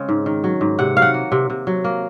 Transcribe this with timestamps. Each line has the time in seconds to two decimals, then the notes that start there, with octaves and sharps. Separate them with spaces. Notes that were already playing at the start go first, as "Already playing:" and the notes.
Already playing: C#3 G#3 C4
0.09 G#2
0.26 D#3
0.44 F#3
0.61 G#2
0.79 C3 F#5
0.96 F#3 F5
1.02 F#5
1.14 A#3
1.32 C3
1.50 C3
1.67 F#3
1.84 A#3